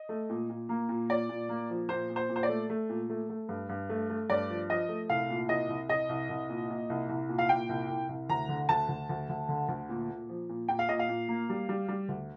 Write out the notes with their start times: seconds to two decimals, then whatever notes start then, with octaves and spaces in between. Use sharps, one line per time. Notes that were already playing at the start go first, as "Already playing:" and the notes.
Already playing: D#5
0.09 A3
0.29 A#2
0.49 A#2
0.69 A#3
0.89 A#2
1.09 A#2 D5
1.29 A#2
1.49 A#3
1.70 F3
1.89 A#2 C5
2.10 A#2
2.16 C5
2.29 A#2
2.36 C5
2.43 D5
2.49 A3
2.70 A3
2.89 A#2
3.10 A3
3.29 A3
3.49 G2
3.69 G2
3.89 A3
4.10 A3
4.30 G2 D5
4.49 F3
4.70 F3 D#5
4.89 A3
5.09 C2 F5
5.29 A#2
5.49 C2 D#5
5.69 C2
5.89 C2 D#5
6.09 C2
6.30 C2
6.49 A#2
6.70 A#2
6.90 C2
7.09 C2
7.29 A#2
7.38 F5
7.49 A#2 G5
7.69 C2
7.90 C2
8.09 C2
8.29 D2 A#5
8.49 D3
8.69 D2 A5
8.89 D2
9.09 D2
9.29 D2
9.49 D3
9.68 D2
9.89 A#2
10.09 A#2
10.29 F3
10.49 A#2
10.68 A#2 G5
10.79 F5
10.89 A#2 D#5
10.99 F5
11.09 A#2
11.28 A#3
11.49 G3
11.69 G3
11.88 G3
12.09 D2